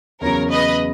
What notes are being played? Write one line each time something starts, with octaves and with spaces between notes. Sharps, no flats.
E2 C#3 F#3 A#4 C#5
B4 D#5